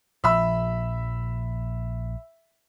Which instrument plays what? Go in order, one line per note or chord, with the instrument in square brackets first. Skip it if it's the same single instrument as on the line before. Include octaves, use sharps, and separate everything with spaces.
[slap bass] A#1 F3 [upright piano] E5 B5 E6